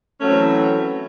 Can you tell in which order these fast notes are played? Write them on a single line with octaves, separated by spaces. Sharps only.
C#4 A3 F#3 C4 E3